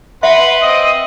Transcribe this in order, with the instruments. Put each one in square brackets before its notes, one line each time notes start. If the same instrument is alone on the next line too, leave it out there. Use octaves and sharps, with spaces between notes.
[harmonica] B4 F#5 C6 [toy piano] E5
[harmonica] C4 D#5 [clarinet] D#6